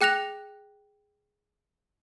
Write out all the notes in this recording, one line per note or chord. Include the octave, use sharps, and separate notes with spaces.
G#4 G5 F#6 A#6 F7